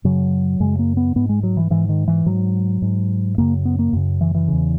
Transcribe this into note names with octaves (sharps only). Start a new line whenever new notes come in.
F#2 C#3 F#3
F#2 C#3 G#3
A#3
B3
G#2 B3
G#3
F#3
E3
G#2 E3
D#3
E3
G#2 F#3
G#2
F#2 C#3 A#3
B3
A#3
F#2 C#3
E3
E3
E2 C#3